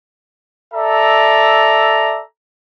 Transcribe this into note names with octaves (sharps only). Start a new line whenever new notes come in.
A4 D5 E5 A#5